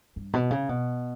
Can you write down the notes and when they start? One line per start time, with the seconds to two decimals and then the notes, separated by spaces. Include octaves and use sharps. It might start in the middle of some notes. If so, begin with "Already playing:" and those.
0.16 G2
0.33 B2
0.51 C#3
0.69 B2